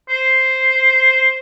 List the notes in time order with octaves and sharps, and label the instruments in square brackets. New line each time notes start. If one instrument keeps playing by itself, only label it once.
[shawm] C5